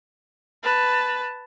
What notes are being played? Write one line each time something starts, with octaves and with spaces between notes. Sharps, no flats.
B4 A5